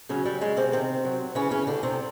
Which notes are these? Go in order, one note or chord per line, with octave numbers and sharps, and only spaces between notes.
C#3 F#3 C#4
G3
C#3 G#3
C3 C4
C3 D#3 C4
F#3
C#3 E3 C#4
C#3 C#4
D3 G3 D4
C3 C4